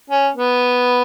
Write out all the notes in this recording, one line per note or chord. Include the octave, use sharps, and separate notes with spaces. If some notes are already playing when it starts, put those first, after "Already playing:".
C#4
B3